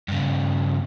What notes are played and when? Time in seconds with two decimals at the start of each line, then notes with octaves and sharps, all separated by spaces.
0.08 G2 C#3